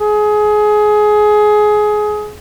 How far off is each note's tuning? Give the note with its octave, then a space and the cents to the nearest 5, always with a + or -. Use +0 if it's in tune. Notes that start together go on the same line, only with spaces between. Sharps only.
G#4 +20